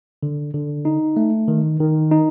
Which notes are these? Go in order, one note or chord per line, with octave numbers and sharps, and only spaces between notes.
D3
D3
D#4
A3
D#3
D#3
D#4